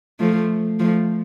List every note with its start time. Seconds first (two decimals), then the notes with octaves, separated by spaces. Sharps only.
0.20 F3 A3
0.80 F3 A3